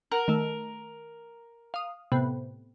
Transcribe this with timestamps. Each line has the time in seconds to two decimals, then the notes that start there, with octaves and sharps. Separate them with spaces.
0.12 A#4 F#5 A#5
0.28 D#3 A3
1.74 F5 D#6
2.12 A2 C3 B3